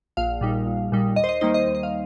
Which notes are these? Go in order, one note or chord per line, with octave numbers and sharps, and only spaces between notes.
A#1 F5
A#2 G3 D#4
A#1
A#2 G3 D#4
D#2 D#5
C5
D#5
D#3 G3 A#3 D#4 C5
D#5
D#2
D#5
F5